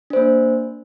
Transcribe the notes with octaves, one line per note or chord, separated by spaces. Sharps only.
A#3 D4 C5